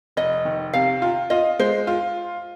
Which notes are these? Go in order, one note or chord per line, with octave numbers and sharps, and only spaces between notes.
F1 D#5
D#3
C3 F5
F4
F4 D#5
G#3 C5
F4